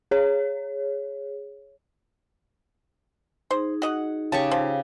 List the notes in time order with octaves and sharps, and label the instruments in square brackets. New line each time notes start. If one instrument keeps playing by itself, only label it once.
[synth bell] G#4 C#5
[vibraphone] D#4 G#4 [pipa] C5
[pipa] F#4 D#5 F#5
[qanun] C#3 G4 C#6 [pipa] A5
[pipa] F3